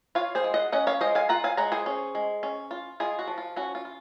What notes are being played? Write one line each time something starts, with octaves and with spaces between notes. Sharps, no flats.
F4 C#5 F5
G#4 C5
G#3
D#5 F#5
C#4 D#5 F#5
C#5 F5
G#3 C5 D#5
F5 G#5
F4 F#5 A#5
F5 G#5
G#3 F#5 A#5
G#4 C5
C#4
G#3
C#4
F4
G#3 F4 G#4
F#4
F3
F4
C#4 F#4
F4
F4